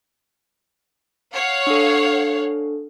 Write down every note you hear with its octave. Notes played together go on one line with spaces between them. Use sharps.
C#5 F5 F#5
D4 A4